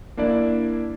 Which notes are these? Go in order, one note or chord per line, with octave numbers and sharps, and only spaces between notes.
A#3 D4 E4 D5